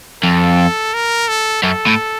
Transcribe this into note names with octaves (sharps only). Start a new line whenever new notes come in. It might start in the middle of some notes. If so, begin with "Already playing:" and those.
F2 A4
A#4
A4
F#2 A4
A2